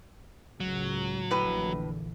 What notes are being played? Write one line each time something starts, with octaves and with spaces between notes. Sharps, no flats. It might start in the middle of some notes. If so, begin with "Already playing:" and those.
C#2 A2 C#3 F#3
A#1 A2 D3 E3 B4